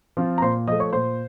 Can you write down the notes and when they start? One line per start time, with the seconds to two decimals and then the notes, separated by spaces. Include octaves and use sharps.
0.17 F3 C4 F4
0.38 A#5
0.42 A#2 C5 C6
0.67 F3 D#5 D#6
0.72 A3
0.80 C#5 C#6
0.93 A#2 C5 C6